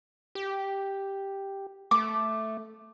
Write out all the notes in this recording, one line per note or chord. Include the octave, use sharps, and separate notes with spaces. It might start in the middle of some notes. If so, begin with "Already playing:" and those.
G4
A3 D6